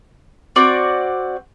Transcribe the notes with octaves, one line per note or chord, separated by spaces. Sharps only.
C4 F#4 D5